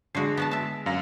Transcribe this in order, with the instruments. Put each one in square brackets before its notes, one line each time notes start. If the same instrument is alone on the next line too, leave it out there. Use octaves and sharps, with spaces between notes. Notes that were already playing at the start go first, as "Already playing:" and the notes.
[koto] D3 F#4 [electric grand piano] G#3 C7
[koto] B3 F#4 A5
E5 A5
[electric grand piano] F#2 F5 A#6